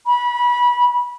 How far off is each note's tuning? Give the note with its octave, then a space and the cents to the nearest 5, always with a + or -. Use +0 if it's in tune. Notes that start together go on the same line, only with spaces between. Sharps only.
B5 -25